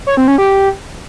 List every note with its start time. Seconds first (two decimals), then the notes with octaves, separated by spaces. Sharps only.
0.07 C#5
0.17 C4
0.28 C#4
0.38 G4